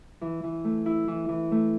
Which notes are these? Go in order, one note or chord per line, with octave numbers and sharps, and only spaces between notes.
E3
E3
A3
E4
E3
E3
A3